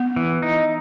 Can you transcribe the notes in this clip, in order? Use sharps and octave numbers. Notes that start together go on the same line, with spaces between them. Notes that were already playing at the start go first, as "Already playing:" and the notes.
Already playing: B3
E3
D#4